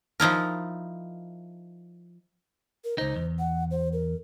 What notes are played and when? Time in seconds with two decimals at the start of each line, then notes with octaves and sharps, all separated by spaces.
0.20 F3 D#4 E4 A#4
2.84 A#4
2.98 C#2 D#4 C5
3.16 E2
3.39 F#5
3.71 C5
3.93 A#4